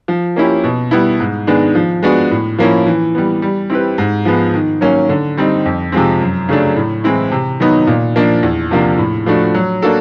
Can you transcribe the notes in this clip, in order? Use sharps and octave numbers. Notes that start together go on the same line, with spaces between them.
F3
A#3 C#4 E4 G4
B2
G3 B3 E4
G#2
D#3 G#3 B3 D4
F3
G#3 B3 D4 F#4
A2
F3 A#3 C#4 E4
E3
G3 B3
G3
C4 E4 G4 B4
G#2
F3 G#3 B3
D#3
F#3 A#3 C#4
D3
G3 C4 D#4
F2
C3 F3 G#3 C4
F#2
C#3 F#3 A3 D4
A2
E3 G#3 C4 E4
C3
D#3 F#3 B3 D#4
A#2
F3 A#3 D4
E2
C3 F3 A#3 D4
A2
F3 A3 D4 F#4
F#3
A#3 D4 F#4 A4